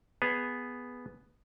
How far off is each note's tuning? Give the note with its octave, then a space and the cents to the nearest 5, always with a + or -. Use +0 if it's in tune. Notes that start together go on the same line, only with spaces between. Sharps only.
B3 +0 G#4 +0